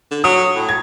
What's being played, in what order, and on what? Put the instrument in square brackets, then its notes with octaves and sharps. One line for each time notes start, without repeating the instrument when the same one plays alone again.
[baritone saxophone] D3
[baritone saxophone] F#3 [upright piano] D#6
[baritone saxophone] A2
[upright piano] G#6